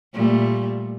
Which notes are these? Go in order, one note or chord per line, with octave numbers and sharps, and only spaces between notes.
A#2 G3 A3